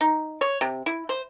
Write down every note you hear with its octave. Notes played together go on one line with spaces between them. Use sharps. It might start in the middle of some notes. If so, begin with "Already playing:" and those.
D#4
C#5
C3
E4
C5